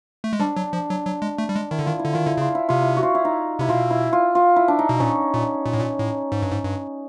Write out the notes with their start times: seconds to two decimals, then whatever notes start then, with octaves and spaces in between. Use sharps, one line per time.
0.24 A3
0.33 G#3
0.40 G3 D4
0.57 F#3
0.73 F3
0.90 F#3
1.06 F#3
1.22 G#3
1.38 A3
1.49 G3
1.55 G#3
1.71 D#3 E4
1.79 D3
1.85 D#3 F4
1.99 D3 E4
2.13 D#3 F4
2.26 D3 E4
2.37 C#3 F4
2.55 E4
2.69 C3 F4
2.82 E4
2.97 F#4
3.03 F4
3.15 E4
3.25 D#4
3.59 C3 E4
3.69 B2 F4
3.91 E4
4.13 F4
4.35 F4
4.56 E4
4.68 D4
4.79 D#4
4.89 B2
5.00 A#2 C#4
5.33 A#2
5.66 A#2
5.73 A2
5.80 A#2
5.99 A2
6.32 G#2
6.42 G2
6.52 G#2
6.65 G2